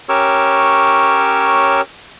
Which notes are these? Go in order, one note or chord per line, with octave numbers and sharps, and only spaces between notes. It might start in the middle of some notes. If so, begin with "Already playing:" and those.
C#4 G4 A#4 C#5 E6